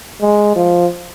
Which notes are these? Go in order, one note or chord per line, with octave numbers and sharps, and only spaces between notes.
G#3
F3